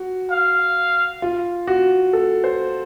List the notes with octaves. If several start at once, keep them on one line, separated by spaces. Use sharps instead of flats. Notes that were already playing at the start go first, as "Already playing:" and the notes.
Already playing: F#4
F5
F4
F#4
A4
C5